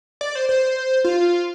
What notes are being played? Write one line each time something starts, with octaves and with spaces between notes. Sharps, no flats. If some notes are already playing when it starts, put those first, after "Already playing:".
D5
C5
C5
F4